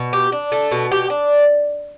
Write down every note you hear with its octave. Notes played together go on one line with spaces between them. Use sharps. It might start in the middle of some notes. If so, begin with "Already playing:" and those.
Already playing: B2
G4
D4
A3
B2
G4
D4